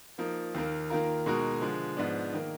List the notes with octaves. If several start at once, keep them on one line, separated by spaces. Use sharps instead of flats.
F3 A#3 D#4
D#2 D#3 A#3
D#3 A#3 F4 A#4
B2 G#3 D#4 F#4 A#4
D3 F3 G#3
G#2 F3 B3 D4
D#3 A#3